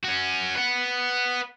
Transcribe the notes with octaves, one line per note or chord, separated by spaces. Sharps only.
C#4 F#4
B4 F#5